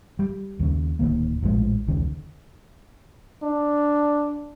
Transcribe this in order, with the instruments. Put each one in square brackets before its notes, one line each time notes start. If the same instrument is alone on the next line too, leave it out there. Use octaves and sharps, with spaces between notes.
[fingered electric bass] G3
D#2 C#3
D1 A#1 D#3 A#3
A#1 A2 F3 G#3
E1 C#2 D#3 C#4
[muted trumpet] D4